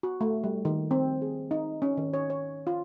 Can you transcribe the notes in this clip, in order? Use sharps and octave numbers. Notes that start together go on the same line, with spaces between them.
F#4
A3
G3
D#3
C4
G#4
D#4
C#4
D#3
C#5
C#5
F4